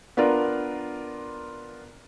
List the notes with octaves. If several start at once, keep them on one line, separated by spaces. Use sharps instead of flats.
B3 D4 F4 A#4 D5